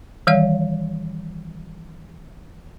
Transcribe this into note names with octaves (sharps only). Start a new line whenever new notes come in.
D#3 E3 G3 C#5 D5 F5